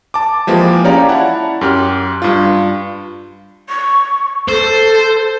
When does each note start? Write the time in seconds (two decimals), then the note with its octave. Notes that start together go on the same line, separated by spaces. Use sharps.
0.14 A5 D6
0.47 E3 F3 G#3 A#3 G4
0.84 C#4 G4 C#5 D5 F5 A#5
1.09 E4 C#5 F#5 A5
1.61 F#2 G4 F6
2.22 G2 F4
3.69 C#6
4.49 A4 C5